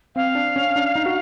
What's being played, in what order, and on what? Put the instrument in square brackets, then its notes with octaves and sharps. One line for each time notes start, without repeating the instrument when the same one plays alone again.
[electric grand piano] C4 [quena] F5
[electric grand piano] D4
C#4
D4
D#4
F#4